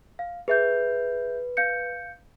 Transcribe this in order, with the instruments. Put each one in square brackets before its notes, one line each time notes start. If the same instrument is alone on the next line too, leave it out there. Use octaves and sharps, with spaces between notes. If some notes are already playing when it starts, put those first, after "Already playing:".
[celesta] F5
[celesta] G#4 E5 G6 [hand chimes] B4
[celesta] F5 G6 C#7